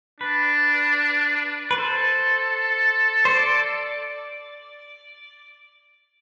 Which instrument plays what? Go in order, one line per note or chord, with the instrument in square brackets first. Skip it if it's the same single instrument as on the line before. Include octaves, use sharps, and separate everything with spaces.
[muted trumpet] D4 [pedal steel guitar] B4
[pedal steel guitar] B4
[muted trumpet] A4 [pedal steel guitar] C5
[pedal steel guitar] C5
D5